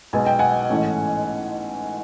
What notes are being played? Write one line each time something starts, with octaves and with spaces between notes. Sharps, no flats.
B1 B2 G#3 B3 G#5
G5
F#5 G#5
A1 G#2 E3 A3 C#4